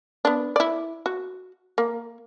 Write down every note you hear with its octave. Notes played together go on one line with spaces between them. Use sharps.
B3 D4
E4 D5
F#4
A#3